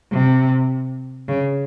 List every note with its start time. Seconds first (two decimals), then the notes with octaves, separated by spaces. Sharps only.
0.12 C3
1.28 C#3